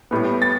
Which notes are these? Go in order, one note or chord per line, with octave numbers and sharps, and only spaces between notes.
A2 G3 B3
A6